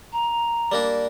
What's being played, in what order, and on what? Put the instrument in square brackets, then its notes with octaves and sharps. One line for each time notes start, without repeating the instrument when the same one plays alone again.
[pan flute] A#5
[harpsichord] G3 A#3 D4